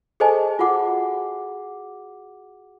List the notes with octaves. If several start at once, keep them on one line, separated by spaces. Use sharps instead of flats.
G#4 A4 C5 D#5 G#5 A5
F4 F#4 G#4 F#5 D6